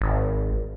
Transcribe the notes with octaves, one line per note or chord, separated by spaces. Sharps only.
G#1